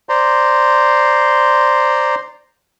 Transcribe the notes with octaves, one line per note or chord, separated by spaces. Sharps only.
C5 D5 A#5 C6